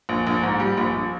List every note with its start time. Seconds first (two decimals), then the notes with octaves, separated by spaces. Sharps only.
0.09 A#1
0.27 A#1
0.43 G#2
0.60 G3
0.77 A#1
0.94 A#1